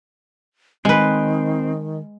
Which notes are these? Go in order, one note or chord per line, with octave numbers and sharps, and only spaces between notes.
D#3 G#3 C4 B4